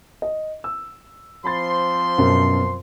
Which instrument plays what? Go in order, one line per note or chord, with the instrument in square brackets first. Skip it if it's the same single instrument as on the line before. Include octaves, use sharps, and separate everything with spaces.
[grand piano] D#5
E6
[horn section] F3 C4 C6 [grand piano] B5 A6
[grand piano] F#2 B2